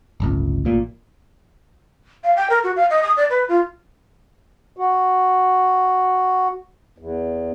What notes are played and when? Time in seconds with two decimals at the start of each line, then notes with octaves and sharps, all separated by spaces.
0.20 D1 G1 C#2
0.65 A1 A#2
2.24 F5
2.37 G5
2.50 A#4
2.64 F#4
2.76 F5
2.90 D#5
3.03 D#6
3.17 D5
3.30 B4
3.49 F4
4.76 F#4
6.98 E2